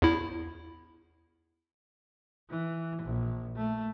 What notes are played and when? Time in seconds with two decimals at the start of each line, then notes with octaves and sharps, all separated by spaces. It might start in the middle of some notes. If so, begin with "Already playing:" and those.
0.02 E2 E4
2.49 E3
3.02 A#1
3.56 A3